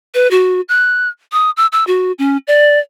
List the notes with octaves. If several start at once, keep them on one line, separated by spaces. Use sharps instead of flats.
B4
F#4
F#6
D#6
E6
E6
F#4
C#4
D5